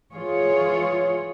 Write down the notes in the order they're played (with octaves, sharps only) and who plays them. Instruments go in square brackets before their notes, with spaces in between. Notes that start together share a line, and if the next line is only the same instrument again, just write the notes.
[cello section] E3 F4 G#4 C#5